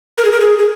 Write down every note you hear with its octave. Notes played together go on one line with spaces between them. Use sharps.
A#4
G#4
A#4
G#4
G#4